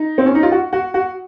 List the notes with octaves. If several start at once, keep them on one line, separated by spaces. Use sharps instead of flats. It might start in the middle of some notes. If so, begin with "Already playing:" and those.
Already playing: D#4
C4
C#4
D#4
F4
F#4
F#4
F#4